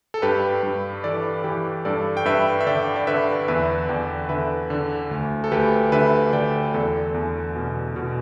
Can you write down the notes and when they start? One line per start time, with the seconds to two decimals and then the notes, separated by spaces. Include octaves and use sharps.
0.14 A4
0.22 G2 G4 B4
0.63 G2
1.04 E3 A4 D5
1.44 E3 G4 B4
1.85 G2 A4 D5
2.17 G5
2.25 G2 B4 E5
2.61 E5
2.67 D3 D5 G5
2.96 D5
3.07 D3 B4 E5
3.48 E2 B4 E5
3.89 E2 D5 G5
4.29 D3 B4 E5
4.70 D3
5.11 D2
5.44 A4
5.51 D2 G4 B4
5.92 D3 B4 E5
6.33 D3 D5 G5
6.73 E2 A4 D5
7.14 E2
7.56 B2
7.96 B2